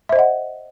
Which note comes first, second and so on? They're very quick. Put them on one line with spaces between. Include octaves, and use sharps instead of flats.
E5 C5 D#5 F#5